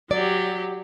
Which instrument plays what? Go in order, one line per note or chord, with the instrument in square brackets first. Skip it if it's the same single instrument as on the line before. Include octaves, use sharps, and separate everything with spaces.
[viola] F#3 G4 [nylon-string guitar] D5